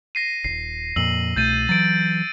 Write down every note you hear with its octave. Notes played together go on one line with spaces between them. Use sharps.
A#6 C7 D#7
D#1 G#1 C7
F2 A#2 E6 F#7
C2 B2 A3 G6 A6 D#7
E3 F#3 A6 D7